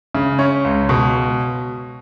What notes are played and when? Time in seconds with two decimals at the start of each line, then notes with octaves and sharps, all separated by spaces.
0.15 C#3
0.39 C#4
0.64 C#2
0.89 B2